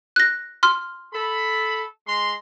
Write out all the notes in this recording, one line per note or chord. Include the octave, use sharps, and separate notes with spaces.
F#6 A#6
C6 F6
A4 B5
G#3 A#5 C6